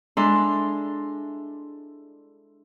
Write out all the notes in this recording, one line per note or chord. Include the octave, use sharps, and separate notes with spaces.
G#3 D4 E4 A4 A#5 C6